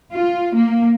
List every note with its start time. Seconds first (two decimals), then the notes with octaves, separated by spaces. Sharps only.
0.13 F4
0.55 A#3